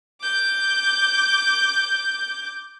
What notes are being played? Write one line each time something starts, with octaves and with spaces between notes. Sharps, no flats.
D6 G6